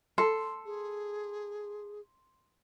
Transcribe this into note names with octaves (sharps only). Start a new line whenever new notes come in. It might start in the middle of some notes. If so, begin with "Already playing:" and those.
A4 C6
G#4